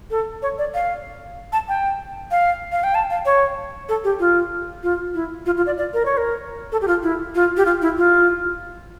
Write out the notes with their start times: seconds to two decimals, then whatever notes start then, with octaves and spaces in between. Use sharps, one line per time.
0.11 A4
0.42 C#5
0.58 D5
0.74 F5
1.53 A5
1.69 G5
2.31 F5
2.72 F5
2.84 G5
2.95 A5
3.10 F5
3.26 C#5
3.89 A4
4.04 G4
4.20 F4
4.83 F4
5.15 E4
5.46 F4
5.57 F4
5.66 D5
5.78 D5
5.94 A#4
6.06 C#5
6.17 A#4
6.72 A4
6.81 G4
6.88 F4
7.03 E4
7.35 F4
7.57 G4
7.66 F4
7.82 E4
7.98 F4